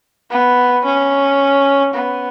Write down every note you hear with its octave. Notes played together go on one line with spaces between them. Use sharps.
B3
C#4
B3